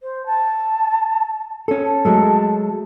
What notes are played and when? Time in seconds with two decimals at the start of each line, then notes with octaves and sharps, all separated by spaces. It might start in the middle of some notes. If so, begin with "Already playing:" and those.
0.01 C5
0.26 A5
1.68 C#4 A4
1.84 A5
2.05 F#3 G#3 A3